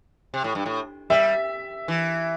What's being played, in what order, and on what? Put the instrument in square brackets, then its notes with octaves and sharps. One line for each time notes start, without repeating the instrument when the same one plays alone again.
[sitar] C3
A2
G2
A2
[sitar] G3 [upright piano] E5
[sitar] E3